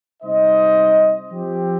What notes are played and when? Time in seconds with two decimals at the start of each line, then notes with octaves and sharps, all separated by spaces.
0.23 C3 G3 D#4 C5 D#5
1.33 F3 C4 G4